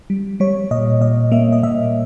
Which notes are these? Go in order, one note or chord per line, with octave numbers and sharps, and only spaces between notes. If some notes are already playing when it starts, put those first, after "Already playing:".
G3
G3 C#5
A#2 D#5
A#2 D#5
A#3 E5
D#5
A#2 E5